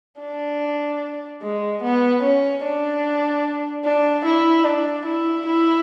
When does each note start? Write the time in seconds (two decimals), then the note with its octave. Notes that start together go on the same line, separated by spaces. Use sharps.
0.20 D4
1.42 G#3
1.82 B3
2.22 C#4
2.63 D4
3.84 D4
4.25 E4
4.64 D4
5.06 E4
5.46 E4